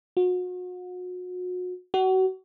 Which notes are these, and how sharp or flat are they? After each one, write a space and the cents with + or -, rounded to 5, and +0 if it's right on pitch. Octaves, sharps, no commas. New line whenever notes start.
F#4 -35
F#4 +30